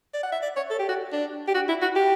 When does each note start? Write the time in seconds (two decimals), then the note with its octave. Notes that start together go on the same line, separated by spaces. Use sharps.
0.14 D5
0.23 F#5
0.32 E5
0.42 D5
0.56 C#5
0.70 A4
0.79 G4
0.88 F#4
1.12 D4
1.48 G4
1.54 F#4
1.68 E4
1.81 F#4
1.96 G4